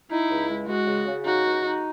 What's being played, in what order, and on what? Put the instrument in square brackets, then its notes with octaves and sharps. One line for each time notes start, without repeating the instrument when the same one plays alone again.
[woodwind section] D#4 [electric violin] E4
[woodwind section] C#2
G#3
[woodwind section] G#3 [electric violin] F#4
[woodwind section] C#3
C#3
[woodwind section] D#4 [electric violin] F#4
[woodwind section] C#2
D#4